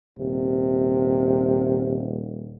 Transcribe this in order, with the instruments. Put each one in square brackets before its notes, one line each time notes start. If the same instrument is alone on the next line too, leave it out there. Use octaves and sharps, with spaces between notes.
[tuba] D#1 [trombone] C3